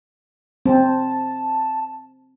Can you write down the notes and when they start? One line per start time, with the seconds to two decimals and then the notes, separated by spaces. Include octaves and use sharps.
0.66 C4 A5